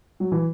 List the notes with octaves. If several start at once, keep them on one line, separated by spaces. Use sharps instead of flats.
F#3
E3